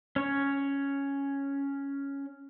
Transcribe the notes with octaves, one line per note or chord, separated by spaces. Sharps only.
C#4 C#5